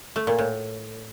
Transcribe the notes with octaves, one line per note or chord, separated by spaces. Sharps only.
A3
A#2
A2